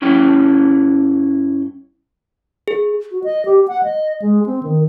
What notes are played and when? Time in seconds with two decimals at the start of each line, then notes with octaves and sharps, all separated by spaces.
0.02 G2 C#4 E4 G5
2.68 G#4
3.11 F#4
3.24 D#5
3.45 G4
3.68 F#5
3.83 D#5
4.22 G#3
4.46 C4
4.63 D#3